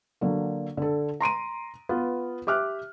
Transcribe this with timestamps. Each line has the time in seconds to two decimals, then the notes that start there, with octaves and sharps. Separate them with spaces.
0.21 D3 F#3 A#3
0.77 D3 A4
1.20 A#5 C6 D7 D#7
1.89 B3 F4
2.47 G4 E5 D6 F6 F#6